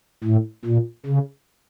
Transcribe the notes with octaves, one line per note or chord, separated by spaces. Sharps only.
A2
A#2
C#3